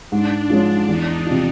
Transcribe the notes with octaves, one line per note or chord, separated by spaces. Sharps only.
G#2 D4
F3 G#3 C#4
E2 D#4
C3 F3